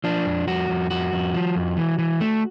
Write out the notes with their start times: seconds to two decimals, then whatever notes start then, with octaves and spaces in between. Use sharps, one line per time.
0.04 F3 D4
0.26 F2
0.47 F2 F#4
0.70 F2
0.91 F2 F#4
1.13 F2
1.34 F3
1.56 F2
1.77 E3
1.99 E3
2.21 A3